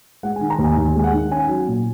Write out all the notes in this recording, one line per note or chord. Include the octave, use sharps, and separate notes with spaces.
G#3 F#5
D#3 G#5
A#5
D#2
G#5
D#2 G#5
G#3 G#5
F#5
D#3
C#4 G#5
F#3 G#5
A#2